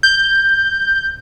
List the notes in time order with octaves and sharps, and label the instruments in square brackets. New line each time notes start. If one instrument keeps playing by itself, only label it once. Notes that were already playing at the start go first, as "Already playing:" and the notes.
[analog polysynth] G6